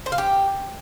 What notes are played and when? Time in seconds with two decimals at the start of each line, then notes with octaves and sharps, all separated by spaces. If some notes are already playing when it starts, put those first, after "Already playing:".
0.06 C5
0.12 F5
0.18 G4